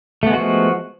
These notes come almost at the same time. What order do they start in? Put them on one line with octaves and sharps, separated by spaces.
A3 B3 G#3 F#4 F3